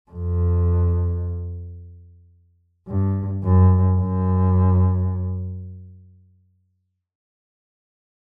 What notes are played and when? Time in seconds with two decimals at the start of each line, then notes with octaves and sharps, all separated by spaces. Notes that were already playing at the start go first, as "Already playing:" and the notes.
0.11 F2
2.88 G2
3.44 F#2
3.99 F#2